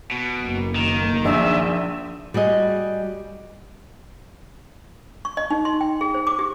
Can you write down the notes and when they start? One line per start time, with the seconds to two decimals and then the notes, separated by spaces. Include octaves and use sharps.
0.12 B2
0.40 F#1 B1 A#3
0.76 D#3
1.25 A#1 E5
2.34 G3 F#4 G#4 D#5
5.25 C#6
5.37 D#5
5.51 D#4
5.65 C6
5.81 G5
6.01 G#4
6.14 C5
6.27 D6
6.39 G4